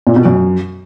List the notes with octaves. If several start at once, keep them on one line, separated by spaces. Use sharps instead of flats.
A#2
B2
F#2